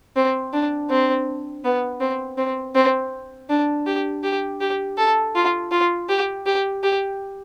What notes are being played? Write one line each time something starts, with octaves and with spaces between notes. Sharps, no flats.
C4
D4
C4
B3
C4
C4
C4
D4
G4
G4
G4
A4
F4
F4
G4
G4
G4